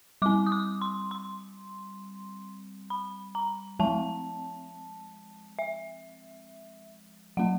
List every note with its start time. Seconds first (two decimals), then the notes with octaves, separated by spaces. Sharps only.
0.22 G3 C4 D6
0.46 D#6
0.52 D6
0.82 C6
1.11 C6
2.90 B5
3.35 A#5
3.79 F3 G#3 C4 A5
5.59 E5
7.37 F#3 A3 C#4 F#5